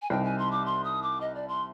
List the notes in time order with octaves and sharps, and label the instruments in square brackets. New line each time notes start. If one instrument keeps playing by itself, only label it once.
[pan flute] G#5
[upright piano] C2 C3 G3 C4 D#4 [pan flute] G5
[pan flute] G#5
C6
D6
C6
D#6
D6
D#5
D5
C6